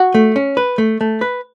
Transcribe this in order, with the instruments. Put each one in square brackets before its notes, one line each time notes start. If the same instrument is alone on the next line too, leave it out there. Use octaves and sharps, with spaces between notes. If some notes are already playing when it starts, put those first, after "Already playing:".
Already playing: [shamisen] F#4
[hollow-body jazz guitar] A3
C#4
B4
A3
A3
B4